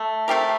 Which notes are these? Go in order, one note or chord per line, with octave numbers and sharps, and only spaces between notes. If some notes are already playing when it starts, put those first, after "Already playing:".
Already playing: A3
A3 C4 G4 A#4